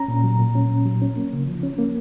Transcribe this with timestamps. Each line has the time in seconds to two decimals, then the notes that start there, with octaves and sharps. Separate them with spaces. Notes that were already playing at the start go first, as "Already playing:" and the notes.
Already playing: C#4 A#5
0.08 A#2
0.24 F#3
0.39 A#2
0.55 C#4
0.71 A#2
0.85 F#3
1.02 C#4
1.16 A#3
1.33 C#3
1.47 F3
1.63 C#4
1.78 A#3